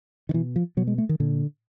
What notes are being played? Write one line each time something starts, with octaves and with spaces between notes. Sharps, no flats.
D#3
B2 E3
F3
B2 F#3
G#3
A3
D#3
A#2 D3